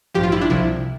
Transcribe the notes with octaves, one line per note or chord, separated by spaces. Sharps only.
A1 G2 F3 G4
F4
E4
D4
C2 C3 F3 E4